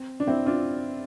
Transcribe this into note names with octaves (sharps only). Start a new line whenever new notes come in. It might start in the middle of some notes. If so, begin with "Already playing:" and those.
Already playing: C4
D4
C4 E4
D4 F4